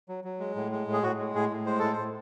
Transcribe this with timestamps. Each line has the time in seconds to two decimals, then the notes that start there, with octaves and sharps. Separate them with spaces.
0.09 F#3
0.24 F#3
0.40 G#3
0.56 A2
0.72 G#3
0.87 A2
0.93 G#4
1.03 A2 F#4
1.19 G#3
1.35 A2 G#4
1.51 A2
1.66 G#3 C5
1.79 A2 A4
1.93 C5
1.98 A2